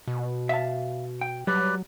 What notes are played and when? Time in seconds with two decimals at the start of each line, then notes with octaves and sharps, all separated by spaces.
0.08 B2
0.49 E5 F5 A5
1.21 G5
1.47 F#3 G3 B4 D5